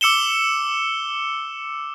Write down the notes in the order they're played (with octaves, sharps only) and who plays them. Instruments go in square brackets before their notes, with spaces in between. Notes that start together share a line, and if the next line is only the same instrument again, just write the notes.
[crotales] D6 E6 C#7 E7 G7